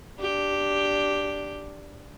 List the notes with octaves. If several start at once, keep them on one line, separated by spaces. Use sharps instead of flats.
D4 G4